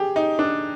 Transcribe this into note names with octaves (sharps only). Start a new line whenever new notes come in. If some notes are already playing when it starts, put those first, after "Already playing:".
Already playing: G4 G#4
D#4
D4